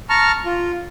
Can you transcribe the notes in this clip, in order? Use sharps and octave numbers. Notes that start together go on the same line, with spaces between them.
A5 A#5 C#6 F6
F4